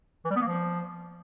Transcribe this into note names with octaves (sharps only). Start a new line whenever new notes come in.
E3
G3
B3
A#3
F3